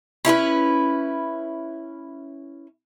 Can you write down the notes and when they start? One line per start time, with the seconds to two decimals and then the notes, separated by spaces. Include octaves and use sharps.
0.25 C#4 E4 A#4 B4